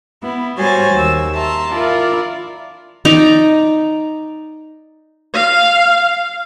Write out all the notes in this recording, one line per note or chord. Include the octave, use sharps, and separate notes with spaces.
B3 E4
G3 F#4 C5 C#5 G#5 A6
D#2 E6
E5 A5 A#5 C6
E4 F4 A#4 D5
D#4 D5 A#5
F5